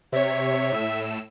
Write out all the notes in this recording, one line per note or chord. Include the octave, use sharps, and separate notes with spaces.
C3 C#5 E5
A2 E6